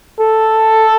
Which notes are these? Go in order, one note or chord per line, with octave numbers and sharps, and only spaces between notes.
A4